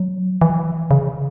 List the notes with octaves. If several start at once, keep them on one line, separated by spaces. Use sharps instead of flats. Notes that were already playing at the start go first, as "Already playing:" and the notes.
Already playing: F#3
E3
C#3